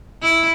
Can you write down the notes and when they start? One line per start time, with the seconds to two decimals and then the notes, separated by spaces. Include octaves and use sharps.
0.22 E4